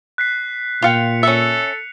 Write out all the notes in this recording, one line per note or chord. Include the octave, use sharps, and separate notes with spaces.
F#6 B6 C7
A#2 F4 F5 G5 C#7 F7
C#4 A4 E5